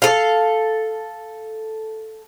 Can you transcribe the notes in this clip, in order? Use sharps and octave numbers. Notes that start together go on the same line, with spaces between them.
A4 F5